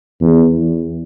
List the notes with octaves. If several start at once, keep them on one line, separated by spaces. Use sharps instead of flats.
E2